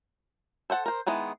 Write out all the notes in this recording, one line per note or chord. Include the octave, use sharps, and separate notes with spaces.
A4 C5 F#5 A5
A#4 C5
D#3 G#3 B3 E4